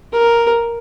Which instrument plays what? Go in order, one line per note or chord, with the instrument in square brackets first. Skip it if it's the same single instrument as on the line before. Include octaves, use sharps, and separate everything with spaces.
[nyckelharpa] A#4